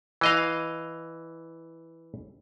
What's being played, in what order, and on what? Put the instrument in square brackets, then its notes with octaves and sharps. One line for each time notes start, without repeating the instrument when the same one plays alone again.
[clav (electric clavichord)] E3 D#5 F5